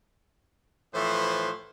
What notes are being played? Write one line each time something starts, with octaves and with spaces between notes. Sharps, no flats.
A2 E3 F3 A3 B4 C5